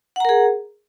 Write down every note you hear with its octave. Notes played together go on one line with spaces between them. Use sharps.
G#4 A#4 F#5 A#5